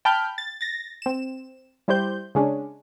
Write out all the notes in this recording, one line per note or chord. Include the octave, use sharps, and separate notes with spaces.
G5 A5 B5 F6 G6
A6
A6 A#6
C4 E7
G3 E4 G4 C5 G6
C#3 G#3 C#4 D4